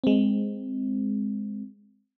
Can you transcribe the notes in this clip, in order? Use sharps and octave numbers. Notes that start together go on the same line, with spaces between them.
G#3 C4